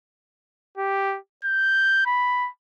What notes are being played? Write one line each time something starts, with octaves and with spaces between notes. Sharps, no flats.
G4
G6
B5